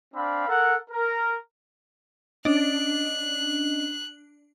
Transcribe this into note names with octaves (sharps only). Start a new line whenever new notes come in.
C4 D4 F5 B5
A4 A#4 F#5
A#4
C#4 D4 D#5 F#6